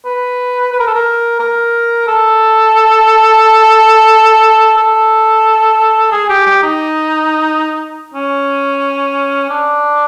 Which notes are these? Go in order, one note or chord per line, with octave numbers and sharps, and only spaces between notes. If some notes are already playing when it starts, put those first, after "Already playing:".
B4
B4
A#4
A4
A#4
A#4
A4
A4
G#4
G4
G4
D#4
C#4
D4